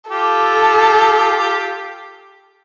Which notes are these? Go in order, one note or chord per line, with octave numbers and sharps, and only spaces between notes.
F4 G4 A4